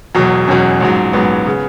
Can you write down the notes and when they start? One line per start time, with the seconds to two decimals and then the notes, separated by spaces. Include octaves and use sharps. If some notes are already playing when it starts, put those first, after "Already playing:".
0.15 E1 E2 B2 F#3
0.48 E1 E2 B2 F#3 C#4
0.81 A#1 G#2 F#3
1.13 A#1 G#2 F#3 B3
1.46 C#3